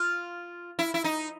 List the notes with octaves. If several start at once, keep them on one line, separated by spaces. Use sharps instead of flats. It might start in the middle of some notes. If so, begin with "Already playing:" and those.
Already playing: F4
E4
E4
D#4